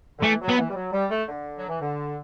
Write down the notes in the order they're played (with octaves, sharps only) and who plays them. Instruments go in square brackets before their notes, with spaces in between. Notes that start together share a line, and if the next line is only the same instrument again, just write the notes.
[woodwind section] D3
[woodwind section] E3 [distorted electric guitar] A3
[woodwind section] F#3
[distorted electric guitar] B3
[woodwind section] E3
G3
F#3
G3
A3
D3
F#3
E3
D3